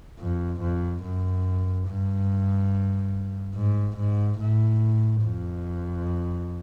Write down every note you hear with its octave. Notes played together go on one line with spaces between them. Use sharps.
F2
F2
F#2
G2
G#2
G#2
A2
F2